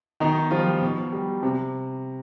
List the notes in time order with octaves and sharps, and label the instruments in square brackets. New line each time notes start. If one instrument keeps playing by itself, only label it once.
[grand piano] B2 D#3 D#4
F3 G3 F4
B2
G3
C3